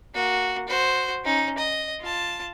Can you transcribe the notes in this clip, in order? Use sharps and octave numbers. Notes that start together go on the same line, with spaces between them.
A#3 F#4
F#4 C5
C#4 D#4
D#5
F4 A5